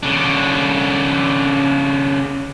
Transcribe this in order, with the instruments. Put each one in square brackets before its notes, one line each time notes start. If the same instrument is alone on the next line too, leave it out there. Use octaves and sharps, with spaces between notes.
[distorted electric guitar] C#3 D4